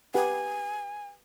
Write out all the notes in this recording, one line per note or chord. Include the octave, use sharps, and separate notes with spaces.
G4 B4 F#5 G#5